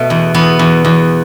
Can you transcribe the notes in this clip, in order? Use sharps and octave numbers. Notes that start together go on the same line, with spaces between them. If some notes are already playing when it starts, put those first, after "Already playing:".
Already playing: B2 A3
E2
E2 B3
E2
E2